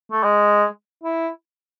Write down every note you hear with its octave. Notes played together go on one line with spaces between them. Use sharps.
A3
G#3
E4